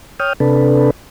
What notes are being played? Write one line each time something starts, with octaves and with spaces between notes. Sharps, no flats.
C#5 G5 D#6 F6
C3 D4 A4 B4